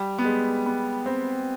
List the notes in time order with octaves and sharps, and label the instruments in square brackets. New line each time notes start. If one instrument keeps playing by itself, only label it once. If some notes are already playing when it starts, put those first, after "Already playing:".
Already playing: [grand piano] G3
B3
G#3
B3
C4